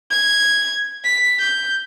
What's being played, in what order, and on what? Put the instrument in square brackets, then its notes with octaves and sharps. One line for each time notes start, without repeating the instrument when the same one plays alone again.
[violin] G#6
B6
G6